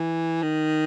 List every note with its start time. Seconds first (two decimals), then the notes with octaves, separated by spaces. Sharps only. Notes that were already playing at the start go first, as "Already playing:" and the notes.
Already playing: E3
0.43 D#3